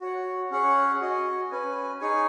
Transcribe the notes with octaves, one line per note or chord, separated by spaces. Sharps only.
F#4 C#5 F#5
C#4 G#4 C#5 F#5
F#4 D#5 G#5
C#4 B4 G#5
D#4 G#4 C#5 G#5